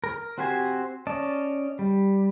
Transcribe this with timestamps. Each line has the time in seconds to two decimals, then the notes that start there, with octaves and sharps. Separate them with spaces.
0.04 A#4
0.38 C4 F#4 G4 C5 G#5
1.07 C#4 D5 D#5 A5
1.79 G3